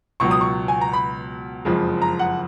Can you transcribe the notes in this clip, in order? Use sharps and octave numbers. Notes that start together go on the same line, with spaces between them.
C#2 B2 F#3 C#6
D#6
C#6
G#5
A#5
B5
F#1 F2 F3 G#3
A#5
F#5